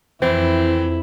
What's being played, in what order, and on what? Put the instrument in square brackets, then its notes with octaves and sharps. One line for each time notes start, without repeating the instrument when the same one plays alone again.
[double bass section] F2 [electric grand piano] E3 [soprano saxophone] C4 [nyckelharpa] E4